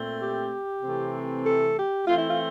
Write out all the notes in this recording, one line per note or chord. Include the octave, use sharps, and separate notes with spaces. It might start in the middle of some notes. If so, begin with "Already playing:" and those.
Already playing: A#2 A3 C4
G4
C3 E3 A3 C4
A4
G4
E3 A3 C4 F4
E4
F4